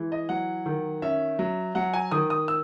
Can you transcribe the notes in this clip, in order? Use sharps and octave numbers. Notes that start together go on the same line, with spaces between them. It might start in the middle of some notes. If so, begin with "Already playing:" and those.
Already playing: E3 G#3
D#5
F#3 F#5
D#3
C#4 E5
F#3
F#3 F#5
G#5
D#3 D#6
D#6
E6